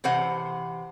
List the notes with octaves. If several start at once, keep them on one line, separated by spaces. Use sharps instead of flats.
C3 E3 C5 F#5